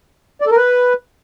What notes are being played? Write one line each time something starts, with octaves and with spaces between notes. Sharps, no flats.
D5
A4
A#4
B4